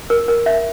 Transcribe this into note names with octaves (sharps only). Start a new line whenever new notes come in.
A#4
A#4
E5